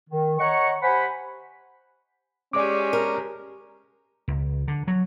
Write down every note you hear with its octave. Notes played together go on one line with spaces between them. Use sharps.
D#3
C#5 D#5 F#5 A#5 C#6
G4 C5 F#5 G#5 B5
G#3 C#4 G4 D5 D6
A#4
C#2
D3
F#3